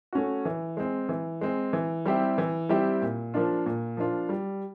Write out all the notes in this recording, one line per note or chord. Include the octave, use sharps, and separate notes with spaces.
A3 C#4 F#4
E3
G#3 C4
E3
G#3 C4
E3
G3 C4 E4 G4
E3
G3 C4 E4 G4
A#2
F3 A#3 D4 F4
A#2
F3 A#3 D4 F4
G3